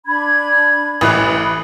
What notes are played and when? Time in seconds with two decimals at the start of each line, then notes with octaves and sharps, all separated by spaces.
0.06 D4 B5 G#6
1.01 A1 E3 B5 F#6